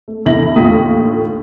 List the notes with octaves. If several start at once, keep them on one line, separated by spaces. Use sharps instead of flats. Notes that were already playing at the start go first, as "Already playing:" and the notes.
A3
E2 D3 E3 E4 A#6 F#7
D#2 A2 D3 F4 D#6 B6